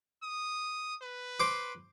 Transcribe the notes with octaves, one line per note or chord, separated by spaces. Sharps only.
D#6
B4
C5 D6